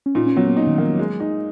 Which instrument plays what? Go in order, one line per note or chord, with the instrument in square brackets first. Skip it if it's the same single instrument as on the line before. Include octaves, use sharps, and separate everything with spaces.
[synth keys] C#4
[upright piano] A#2 [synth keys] D#4
[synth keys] C#4
[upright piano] F#3 [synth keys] B3
[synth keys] A#3
[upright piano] D#4
[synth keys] D#3
[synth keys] F3 [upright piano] A#3
[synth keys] F#3
[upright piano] G#3
D#4